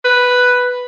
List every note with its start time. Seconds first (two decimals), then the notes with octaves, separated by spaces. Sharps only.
0.04 B4